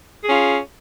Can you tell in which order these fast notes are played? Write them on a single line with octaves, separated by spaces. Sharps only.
G#4 C#4 F4